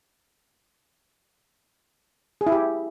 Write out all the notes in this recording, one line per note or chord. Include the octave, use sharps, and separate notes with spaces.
G#4
E4
G4